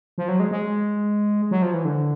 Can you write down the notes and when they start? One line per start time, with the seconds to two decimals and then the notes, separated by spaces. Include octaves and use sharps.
0.18 F3
0.28 F#3
0.40 G#3
0.51 G#3
1.51 F#3
1.62 F3
1.74 E3
1.85 D3